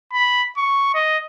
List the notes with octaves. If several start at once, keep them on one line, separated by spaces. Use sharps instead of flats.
B5
C#6
D#5